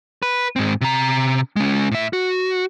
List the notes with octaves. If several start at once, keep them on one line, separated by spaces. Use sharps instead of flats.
B4
G#2 C4
C3 A#5
G#3 C#4
A2 E5
F#4